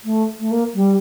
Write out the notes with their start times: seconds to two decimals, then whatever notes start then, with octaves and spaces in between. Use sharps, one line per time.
0.04 A3
0.40 A3
0.51 A#3
0.74 G3